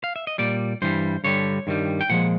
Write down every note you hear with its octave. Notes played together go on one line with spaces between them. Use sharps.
F5
E5
D#5
A#2 G3 D5
G2 E3 G3 C5
G2 D3 G3 C#5
G2 D#3 G3
G5
A#2 F3 G#3 F#5